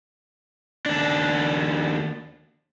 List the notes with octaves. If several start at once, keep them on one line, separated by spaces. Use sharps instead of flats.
D#2 D4